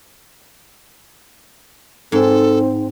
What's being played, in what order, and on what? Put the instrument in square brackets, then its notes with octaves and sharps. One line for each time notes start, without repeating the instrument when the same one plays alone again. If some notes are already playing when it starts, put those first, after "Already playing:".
[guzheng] G#2 [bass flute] C4 [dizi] A4